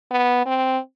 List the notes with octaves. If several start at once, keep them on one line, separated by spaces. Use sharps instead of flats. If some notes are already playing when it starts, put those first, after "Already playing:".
B3
C4